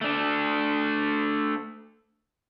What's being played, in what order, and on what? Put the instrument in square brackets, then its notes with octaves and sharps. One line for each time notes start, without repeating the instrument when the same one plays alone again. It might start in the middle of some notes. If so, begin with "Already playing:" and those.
[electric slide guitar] A3 D4